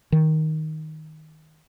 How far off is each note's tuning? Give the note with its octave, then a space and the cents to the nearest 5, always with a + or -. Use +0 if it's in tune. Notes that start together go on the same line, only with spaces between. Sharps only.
D#3 +5